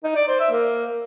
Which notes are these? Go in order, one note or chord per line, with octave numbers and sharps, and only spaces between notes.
D#4
D5
C5
E5
A#3